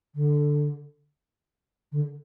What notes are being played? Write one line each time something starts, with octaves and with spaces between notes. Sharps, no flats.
D3
D3